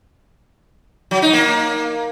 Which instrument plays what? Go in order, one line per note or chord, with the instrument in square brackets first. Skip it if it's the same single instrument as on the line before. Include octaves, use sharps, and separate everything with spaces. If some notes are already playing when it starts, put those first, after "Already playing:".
[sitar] F#3
D#4
A#3